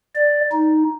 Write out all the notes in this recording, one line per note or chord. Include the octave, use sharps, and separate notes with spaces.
D5
D#4